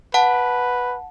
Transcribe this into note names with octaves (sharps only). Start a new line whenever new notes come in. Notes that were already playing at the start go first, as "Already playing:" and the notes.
B4 F#5 A5